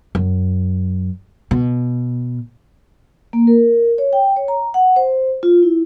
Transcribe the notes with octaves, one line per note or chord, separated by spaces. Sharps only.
F#2
B2
A#3
A#4
C#5
G5
C#5
A#5
F#5
C5
F4
E4